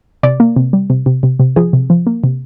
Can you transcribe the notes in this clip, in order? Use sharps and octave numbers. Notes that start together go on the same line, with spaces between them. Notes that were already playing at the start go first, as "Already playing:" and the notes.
C3 D5
A#3
C3
G3
C3
C3
C3
C3
F3 G#4
C3
F3
A#3
C3